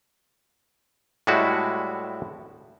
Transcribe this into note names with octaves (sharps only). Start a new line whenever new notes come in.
A2 G3 G#3 E4 F#4 A5